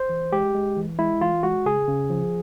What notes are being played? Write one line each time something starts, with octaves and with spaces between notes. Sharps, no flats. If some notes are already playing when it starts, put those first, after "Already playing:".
Already playing: C5
E3
G#3 G4
G#3
E3
G#3 E4
E3 F4
G#3 F#4
C#3 G#4
C#3
F3